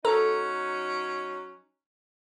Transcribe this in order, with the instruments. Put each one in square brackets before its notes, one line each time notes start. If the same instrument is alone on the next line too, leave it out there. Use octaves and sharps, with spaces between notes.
[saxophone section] F#3 C#4 D#4 [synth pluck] A4 A#5